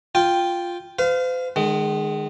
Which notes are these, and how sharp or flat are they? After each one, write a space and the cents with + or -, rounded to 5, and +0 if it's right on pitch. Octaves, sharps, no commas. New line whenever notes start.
F4 +0 G5 +0
C5 -45 F5 +0
D#3 -35 G#3 +0